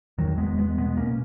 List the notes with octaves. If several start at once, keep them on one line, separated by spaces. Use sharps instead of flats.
E2 D#3 F#3
G#3 B3
E2
G#3 B3
B2 G#3 B3
A#3 C#4
B2